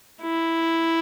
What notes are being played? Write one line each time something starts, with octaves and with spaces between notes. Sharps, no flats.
E4